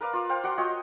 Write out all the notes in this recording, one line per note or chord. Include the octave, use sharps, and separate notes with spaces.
A#4 B4 D5 F5
F4 D5
C5 F5 G5
F#4 D5 F#5 C6
F4 C#5 D#5 G5